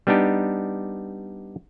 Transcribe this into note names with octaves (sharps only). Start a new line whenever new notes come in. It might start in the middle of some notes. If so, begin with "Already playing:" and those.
G3 B3 D4 D#4 G4